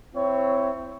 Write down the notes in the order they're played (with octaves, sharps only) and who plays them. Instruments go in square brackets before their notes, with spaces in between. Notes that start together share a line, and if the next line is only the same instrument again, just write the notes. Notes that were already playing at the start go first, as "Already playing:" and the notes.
[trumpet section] C4 E4 C#5